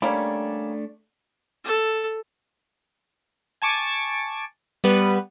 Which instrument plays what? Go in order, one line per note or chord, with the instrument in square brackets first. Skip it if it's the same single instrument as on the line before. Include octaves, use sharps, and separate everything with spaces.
[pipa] G3 A#3 C#4 [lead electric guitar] A3 D4
[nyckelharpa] A4
[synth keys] G#5 A5 C#6 D6
G3 B3 B4